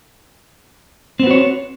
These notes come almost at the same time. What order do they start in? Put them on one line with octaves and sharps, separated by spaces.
C4 B3 F#4 C#5